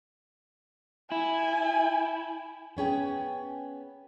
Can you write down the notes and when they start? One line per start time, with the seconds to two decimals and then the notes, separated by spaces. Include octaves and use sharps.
1.12 E4 G#5
2.77 B3 C#4 G#4 G5